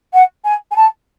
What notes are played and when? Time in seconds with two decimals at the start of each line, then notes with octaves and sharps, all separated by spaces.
0.13 F#5
0.44 G#5
0.71 G#5
0.76 A5